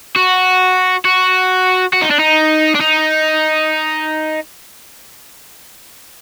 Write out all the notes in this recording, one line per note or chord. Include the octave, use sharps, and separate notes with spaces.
F#4
F#4
F#4
D#4
D4
D#4
D4
D#4